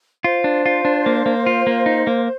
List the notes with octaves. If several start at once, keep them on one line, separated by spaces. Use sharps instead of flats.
F4 C5
D4
F4
D4
A#3
A#3
F4
A#3
D#4
A#3